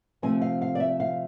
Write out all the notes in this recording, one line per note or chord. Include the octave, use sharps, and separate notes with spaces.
C3 F3 A3 C4 G#5
F5
F5
D5
E5
F5